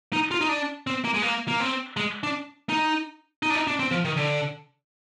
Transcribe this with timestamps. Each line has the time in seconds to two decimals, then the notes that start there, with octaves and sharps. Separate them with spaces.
0.13 D#4
0.31 F4
0.41 D#4
0.49 D4
0.87 C4
1.04 A#3
1.14 G#3
1.22 A#3
1.48 A#3
1.60 C4
1.97 G#3
2.23 D4
2.69 D#4
3.43 D#4
3.50 D4
3.55 D#4
3.67 D4
3.80 C4
3.91 F3
4.05 D#3
4.17 D3